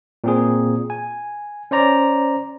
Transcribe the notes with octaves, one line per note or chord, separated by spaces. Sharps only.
A#2 C4 G#4
G#5
C#4 C5 D5 A#5